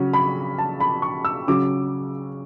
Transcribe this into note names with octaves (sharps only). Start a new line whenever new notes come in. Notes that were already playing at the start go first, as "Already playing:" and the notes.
Already playing: C#3 F#3 C#4
B5
A5
B5
C#6
E6
C#3 F#3 C#4 D6